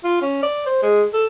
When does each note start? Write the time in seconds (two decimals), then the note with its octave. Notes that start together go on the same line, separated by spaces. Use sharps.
0.04 F4
0.22 C#4
0.43 D5
0.66 C5
0.82 G#3
1.13 A4